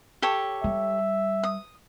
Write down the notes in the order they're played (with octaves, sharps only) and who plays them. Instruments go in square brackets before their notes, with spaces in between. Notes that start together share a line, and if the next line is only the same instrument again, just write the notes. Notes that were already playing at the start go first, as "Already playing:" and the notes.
[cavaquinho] G4 A4 C#5
[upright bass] G3 [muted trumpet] E5
[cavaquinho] D#6